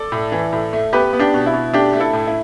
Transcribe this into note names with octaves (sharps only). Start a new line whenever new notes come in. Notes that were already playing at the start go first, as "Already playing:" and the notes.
Already playing: A4 D5
A2
E3
A2
A3
B3 G4 B4
B3
D4 G4
B2
E4
B2
A3 D4 G4
A3
E4 A4
A2
E4